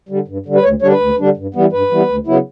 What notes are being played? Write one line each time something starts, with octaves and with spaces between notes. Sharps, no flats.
D3 G3
G2
D3 G3
B4
D2 C#5
D3 G3 D4 C#5
B4
D2
D3 G3 D4
G2
E3 G3 B3
G2 B4
E3 G3 B3
D2
C#3 F#3 B3 E4